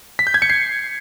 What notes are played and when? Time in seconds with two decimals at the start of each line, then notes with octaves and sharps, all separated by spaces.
0.19 B6
0.27 G6
0.34 G#6
0.42 C#7
0.50 C7